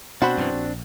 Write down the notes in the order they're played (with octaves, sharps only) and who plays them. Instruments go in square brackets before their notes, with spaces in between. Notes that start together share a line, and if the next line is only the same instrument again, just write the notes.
[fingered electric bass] B2 [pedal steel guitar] C4 D4 [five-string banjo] F#4 C5 B5
[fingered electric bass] F#2 B2 E3
A#1